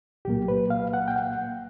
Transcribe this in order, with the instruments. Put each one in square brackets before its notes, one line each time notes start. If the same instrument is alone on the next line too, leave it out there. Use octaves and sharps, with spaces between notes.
[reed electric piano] C2 A#2 F#3 A#3 G4
B4
F5
F#5
G5
F#5